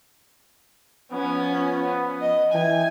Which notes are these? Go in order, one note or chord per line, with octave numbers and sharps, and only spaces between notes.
F3 B3 C#4
D#5
E3 G5 G#5